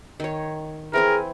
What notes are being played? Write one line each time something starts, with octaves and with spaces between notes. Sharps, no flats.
D#3 C#5
E3 C4 G#4 A#4 G#5